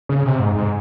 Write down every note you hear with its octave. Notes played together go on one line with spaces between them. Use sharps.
C#3
C3
G#2
G#2